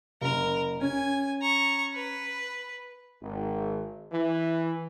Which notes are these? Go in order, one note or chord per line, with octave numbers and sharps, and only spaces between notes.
F#1 A#4
C#4 G#5
A#5 C#6
B4
G#1
E3